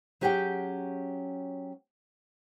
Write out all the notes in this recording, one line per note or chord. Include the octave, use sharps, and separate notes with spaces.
F#3 C#4 G4 G#4 F#5 G5